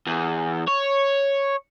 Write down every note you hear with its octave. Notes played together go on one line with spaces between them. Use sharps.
E2
C#5